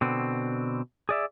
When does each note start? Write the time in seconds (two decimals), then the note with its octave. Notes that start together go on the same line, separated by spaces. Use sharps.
0.01 B2 D3 C4
1.09 G#4 D5 E5